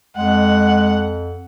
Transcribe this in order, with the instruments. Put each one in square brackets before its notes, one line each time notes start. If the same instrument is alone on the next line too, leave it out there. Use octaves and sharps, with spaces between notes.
[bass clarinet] F2 [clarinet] G#3 [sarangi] F#5